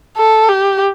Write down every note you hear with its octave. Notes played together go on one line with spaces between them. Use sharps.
A4
G4